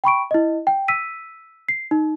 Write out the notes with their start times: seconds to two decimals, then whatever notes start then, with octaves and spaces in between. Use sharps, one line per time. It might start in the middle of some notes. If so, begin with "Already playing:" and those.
0.04 G5 B5 C#6 D7
0.31 E4 D#5
0.67 G5
0.88 E6 B6 D#7
1.69 C7
1.91 D#4